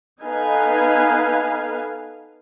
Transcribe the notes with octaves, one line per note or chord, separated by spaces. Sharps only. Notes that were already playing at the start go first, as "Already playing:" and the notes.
B3 D#4 A4 B4 F5 G#5